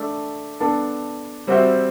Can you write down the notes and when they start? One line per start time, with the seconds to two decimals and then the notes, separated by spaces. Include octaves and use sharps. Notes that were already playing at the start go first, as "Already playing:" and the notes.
Already playing: A3 D4 A4
0.60 B3 D4 A4
1.47 G3 C4 F#4 C5 E5